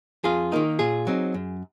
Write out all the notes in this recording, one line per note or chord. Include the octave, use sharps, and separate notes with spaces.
F2 F4 G#4
D#3 A#3 D#4
A#2 F4 G#4
F#3 C4 D#4
F#2